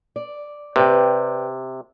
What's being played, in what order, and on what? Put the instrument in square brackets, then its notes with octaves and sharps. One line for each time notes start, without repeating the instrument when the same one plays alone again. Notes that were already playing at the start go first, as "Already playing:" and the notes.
[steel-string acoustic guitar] D5
[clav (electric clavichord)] C3 [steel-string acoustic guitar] B4 D5 G5